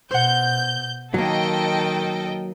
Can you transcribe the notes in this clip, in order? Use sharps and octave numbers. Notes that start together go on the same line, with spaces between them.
B2 C5 F#5 G6
D#3 F#3 A#3 A4 D#5 G5